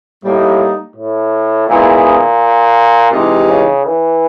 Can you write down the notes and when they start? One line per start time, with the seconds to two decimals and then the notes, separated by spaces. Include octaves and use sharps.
0.24 A2 G3 A#3 D#4
0.96 A2
1.68 A#2 D#3 G#3 B3 E4 G#4
3.12 C3 E3 G#3 C4 D#4 G4
3.49 C#3
3.85 E3